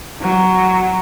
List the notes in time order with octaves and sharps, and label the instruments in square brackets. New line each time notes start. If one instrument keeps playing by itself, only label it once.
[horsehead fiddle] F#3